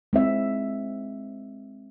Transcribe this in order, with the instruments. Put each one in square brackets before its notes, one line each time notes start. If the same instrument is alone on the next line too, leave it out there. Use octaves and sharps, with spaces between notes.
[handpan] G#3 C4 E5